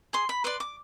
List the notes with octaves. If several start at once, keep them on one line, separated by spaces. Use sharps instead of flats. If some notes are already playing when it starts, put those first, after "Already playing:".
G#4 C6
B5
B4 D5 C6
D6